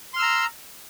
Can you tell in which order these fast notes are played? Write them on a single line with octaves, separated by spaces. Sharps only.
C6 F6 E6 A#5